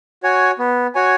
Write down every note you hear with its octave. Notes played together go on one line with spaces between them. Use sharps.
F#4 C#5 G#5
B3
F#4 C#5 G#5